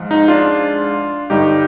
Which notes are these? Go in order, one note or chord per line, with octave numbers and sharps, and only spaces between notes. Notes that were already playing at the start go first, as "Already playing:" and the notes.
Already playing: G#2 F3 G#3
D#4
D4 F4
G2 D3 G3 D#4 G4